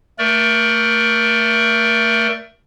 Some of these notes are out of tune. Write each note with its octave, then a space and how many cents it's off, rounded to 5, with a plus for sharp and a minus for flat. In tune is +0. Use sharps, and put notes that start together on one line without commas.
A3 +25 A#4 +25 D5 +0